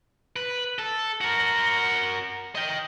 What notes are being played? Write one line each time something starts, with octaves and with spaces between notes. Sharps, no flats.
B4
A4
F#4 A#4
D#5 G5